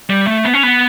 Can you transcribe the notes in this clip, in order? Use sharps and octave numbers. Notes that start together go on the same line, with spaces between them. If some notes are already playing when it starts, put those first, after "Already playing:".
G3
A3
B3
C#4
B3